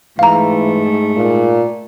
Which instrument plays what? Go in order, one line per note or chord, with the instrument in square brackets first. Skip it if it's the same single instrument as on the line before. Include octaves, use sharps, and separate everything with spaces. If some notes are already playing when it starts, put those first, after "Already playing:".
[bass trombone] G#2 [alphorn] E3 [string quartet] A3 [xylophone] F5 A#5
[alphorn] A#2